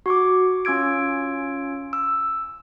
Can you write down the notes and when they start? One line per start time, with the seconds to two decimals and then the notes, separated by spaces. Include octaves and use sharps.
0.06 F#4 C#6 D6
0.65 C#4 F4 E6 G#6 D7
1.93 E6